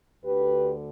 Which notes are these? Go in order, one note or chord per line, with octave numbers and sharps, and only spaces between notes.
D2 D3 G4 B4